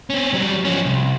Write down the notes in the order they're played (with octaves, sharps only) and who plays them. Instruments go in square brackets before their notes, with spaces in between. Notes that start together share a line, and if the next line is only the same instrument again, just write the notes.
[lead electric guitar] C4 C#4
F#3 G3
F3 C#4
C2